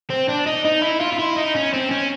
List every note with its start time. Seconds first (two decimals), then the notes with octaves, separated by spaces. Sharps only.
0.10 C4
0.29 D4
0.47 D#4
0.65 D#4
0.82 E4
1.01 F4
1.13 F4
1.19 E4
1.36 D#4
1.56 C#4
1.74 C4
1.91 C#4